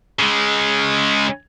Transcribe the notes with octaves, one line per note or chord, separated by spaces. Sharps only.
C#3 G#3